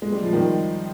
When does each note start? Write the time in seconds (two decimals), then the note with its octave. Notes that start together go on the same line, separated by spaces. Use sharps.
0.02 G#3
0.12 G3
0.22 F3
0.33 D#3 G3